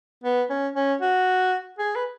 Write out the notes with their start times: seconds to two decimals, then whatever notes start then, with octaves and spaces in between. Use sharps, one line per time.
0.24 B3
0.50 C#4
0.76 C#4
1.01 F#4
1.79 G#4
1.96 B4